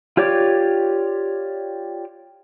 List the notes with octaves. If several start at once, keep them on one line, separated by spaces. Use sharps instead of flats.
F4 G4 C#5 D5 D6